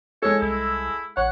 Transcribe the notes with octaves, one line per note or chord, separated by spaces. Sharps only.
G#3 A4 C#5
C2 E4
A1 C#5 F#5